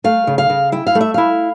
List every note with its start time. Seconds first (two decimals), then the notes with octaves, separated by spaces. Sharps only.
0.04 A3 F5
0.27 C#3
0.38 F5
0.50 C#3
0.72 E4 G5
0.87 F5
0.95 A3
1.01 E5
1.14 E4 F5